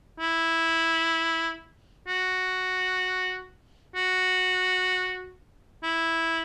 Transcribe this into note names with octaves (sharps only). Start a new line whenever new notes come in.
E4
F#4
F#4
E4